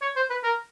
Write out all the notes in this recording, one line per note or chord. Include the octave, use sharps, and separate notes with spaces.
C#5
C5
B4
A#4